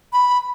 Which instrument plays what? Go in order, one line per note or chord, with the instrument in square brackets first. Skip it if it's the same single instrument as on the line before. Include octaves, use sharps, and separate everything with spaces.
[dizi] B5